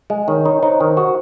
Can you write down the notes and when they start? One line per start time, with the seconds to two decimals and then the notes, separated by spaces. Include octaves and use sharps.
0.10 G#3 D#5
0.28 D#3 C#5
0.45 D#4 C#5
0.63 D#4 C5
0.80 D#3
0.97 F#4